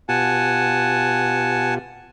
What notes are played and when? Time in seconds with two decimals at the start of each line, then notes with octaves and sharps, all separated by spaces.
0.09 B2 F4 G4 F#5 G#5 A5